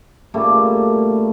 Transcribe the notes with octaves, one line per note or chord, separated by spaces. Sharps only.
A#2 C#3 G3 A3